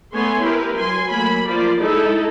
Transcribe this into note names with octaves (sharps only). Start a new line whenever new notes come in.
A3 B3 C#5 G#5 C6
E4 G4 A#4 B4
F#3 G#5 C6
F#3 A3 A#3 B5
F3 A#3 F4 D5
G#3 D#4 E4 A4